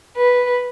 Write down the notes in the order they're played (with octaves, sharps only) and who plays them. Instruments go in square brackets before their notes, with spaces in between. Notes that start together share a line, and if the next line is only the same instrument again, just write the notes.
[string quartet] B4